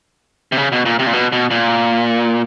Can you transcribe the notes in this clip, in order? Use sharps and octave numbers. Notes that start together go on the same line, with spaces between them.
C3
C#3
B2
A#2
C3
A#2
B2
B2
A#2